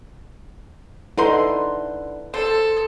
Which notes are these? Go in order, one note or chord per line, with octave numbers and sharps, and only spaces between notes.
D3 D#4 E4 A4 B4 C6
A4 C5